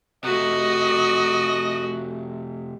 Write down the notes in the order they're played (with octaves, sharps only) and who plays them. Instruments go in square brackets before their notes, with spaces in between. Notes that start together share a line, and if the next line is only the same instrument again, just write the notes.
[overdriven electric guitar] C3 A3 [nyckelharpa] F#4 [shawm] D#5